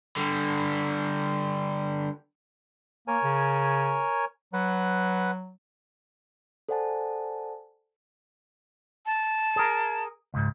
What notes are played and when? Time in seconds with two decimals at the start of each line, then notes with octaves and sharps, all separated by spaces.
0.16 D3 G3
3.08 A#3 A#4 C#5 G#5
3.23 C#3
4.53 F#3 B4 F#5
6.69 A4 C5 D5 F#5 G#5 A5
9.06 A5
9.56 G#4 A#4
10.34 C#2 G#2